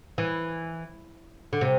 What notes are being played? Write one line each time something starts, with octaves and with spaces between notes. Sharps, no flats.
E3
D3
C3